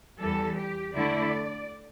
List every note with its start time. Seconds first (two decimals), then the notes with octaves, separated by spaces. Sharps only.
0.19 E2 E3 G3 A4
0.57 G4
0.95 D3 A3 E4 D5